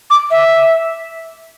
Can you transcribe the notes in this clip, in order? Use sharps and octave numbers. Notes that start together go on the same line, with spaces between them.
D6
E5